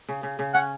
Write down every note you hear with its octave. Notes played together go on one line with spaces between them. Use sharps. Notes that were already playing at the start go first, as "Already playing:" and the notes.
C#3
C#3
C#3
C#4 F#5